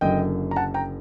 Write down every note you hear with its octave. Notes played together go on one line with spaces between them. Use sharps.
F#1 F#2 D3 D#5 G5
A#5
F#5 A5
G5 A#5